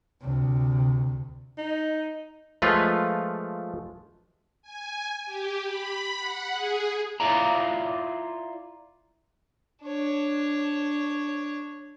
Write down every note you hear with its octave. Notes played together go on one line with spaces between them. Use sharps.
D2 C3
D#4
F3 G#3 A3 F4 B4
G#5
G4
B5
F#5
G#4
E4 F4 D5 A#5
D4 C#5